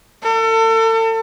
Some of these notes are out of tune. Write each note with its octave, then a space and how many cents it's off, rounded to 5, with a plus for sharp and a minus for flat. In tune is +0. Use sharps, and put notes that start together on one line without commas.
A4 +40